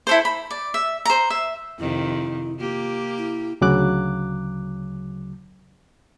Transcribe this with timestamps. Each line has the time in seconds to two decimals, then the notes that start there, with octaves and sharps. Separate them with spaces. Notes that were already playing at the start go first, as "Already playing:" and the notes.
0.07 E4 A4 C5
0.25 B5
0.51 D5
0.74 E5
1.06 C5 A#5
1.30 E5
1.79 F2 C3 D#3 E4
2.59 A#3 F4 G4
3.18 E4
3.61 D2 C#3 F#3 D6 F#6